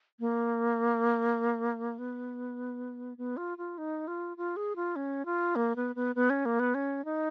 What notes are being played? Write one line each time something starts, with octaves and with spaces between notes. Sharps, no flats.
A#3
B3
B3
F4
F4
D#4
F4
F4
G#4
F4
C#4
F4
A#3
B3
B3
B3
C#4
A#3
B3
C#4
D#4